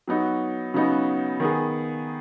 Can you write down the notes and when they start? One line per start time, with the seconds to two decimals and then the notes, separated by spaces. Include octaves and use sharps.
0.08 F#3 B3 D#4 F#4
0.74 C#3 F#3 B3 D#4 F#4
1.40 D#3 B3 G#4